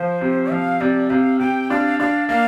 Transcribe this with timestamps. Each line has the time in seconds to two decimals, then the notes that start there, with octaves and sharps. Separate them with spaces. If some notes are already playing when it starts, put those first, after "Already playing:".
Already playing: F3 C5
0.21 C3
0.51 F3 F5
0.81 C3 D5
1.10 C3 F5
1.39 C3 G5
1.70 D4 F5
2.00 D4 F5
2.29 A#3 F5